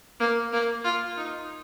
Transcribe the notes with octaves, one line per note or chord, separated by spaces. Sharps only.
A#3
A#3
F4
D#4